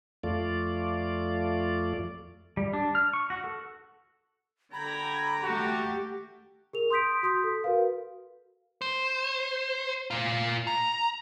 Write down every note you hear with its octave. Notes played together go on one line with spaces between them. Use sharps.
F2 A3 F4 D5
G3
D4
F6
C#6
F#4
A4
D3 G5 A#5 B5 G#6
A3 F#4 G4 F#5
G#4 A#4 F7
C6 D#6 G6 B6 D7
F#4 C6 D#6 G6 B6
A4
F#4 A#4 B4 F5
C5
A#2 F4
A#5